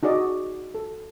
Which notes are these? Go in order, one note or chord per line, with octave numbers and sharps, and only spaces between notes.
D#4 F#4 G#4 D5 D#5
A4